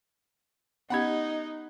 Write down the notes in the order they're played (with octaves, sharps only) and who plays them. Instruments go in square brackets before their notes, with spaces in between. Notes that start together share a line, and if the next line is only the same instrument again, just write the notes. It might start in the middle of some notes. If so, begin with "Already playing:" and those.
[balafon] B3 C#4 G4 [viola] D#4 [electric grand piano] F#5 B5 G#6